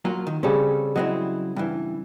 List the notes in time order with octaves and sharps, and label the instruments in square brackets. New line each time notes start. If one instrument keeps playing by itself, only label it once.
[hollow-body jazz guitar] F#3 A#3 F4
D#3
[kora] C#3 G3 C4 [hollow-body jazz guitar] C#4 A4
[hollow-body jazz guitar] F#3 C4 E4 [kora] D#5
[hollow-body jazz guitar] G2 E3